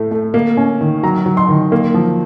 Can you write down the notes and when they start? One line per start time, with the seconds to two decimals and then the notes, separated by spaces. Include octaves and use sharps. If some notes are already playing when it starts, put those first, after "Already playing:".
Already playing: A2 A3
0.11 A3
0.34 A#3
0.57 C#4
0.81 D#3
1.03 F#3 A#5
1.26 F#3
1.37 C6
1.49 D#3
1.72 A#3
1.94 F3